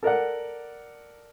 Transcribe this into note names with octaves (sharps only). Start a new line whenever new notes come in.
A4 A#4 D5 F#5